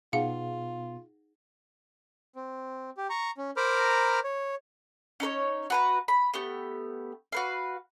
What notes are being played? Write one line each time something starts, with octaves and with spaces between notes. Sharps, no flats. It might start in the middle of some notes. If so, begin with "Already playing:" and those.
B2 B3 D#4 F4 G#4 F5 F#5
C4
G4
A#5 C#6
C#4
A#4 C5 A#5 B5 D6 F6
C#5
C#4 D#4 A#4 C#5
F#4 B4 A#5
B5
A3 B3 G4
F#4 B4 F5